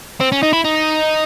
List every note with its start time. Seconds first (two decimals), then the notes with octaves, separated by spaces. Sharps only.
0.21 C4
0.32 C#4
0.43 D#4
0.53 E4
0.64 D#4